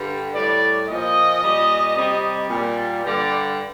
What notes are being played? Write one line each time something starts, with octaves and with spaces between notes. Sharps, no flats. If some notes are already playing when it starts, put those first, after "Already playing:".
Already playing: G2 D3 G3
A2 G3 D5
A#2 F3 D#5
A#2 G3
C3 G3
A#2 G3
G2 D3 G3 D5